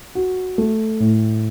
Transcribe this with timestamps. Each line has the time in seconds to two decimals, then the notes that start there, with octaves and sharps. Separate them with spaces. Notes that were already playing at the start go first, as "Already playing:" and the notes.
0.15 F#4
0.58 A3
1.00 A2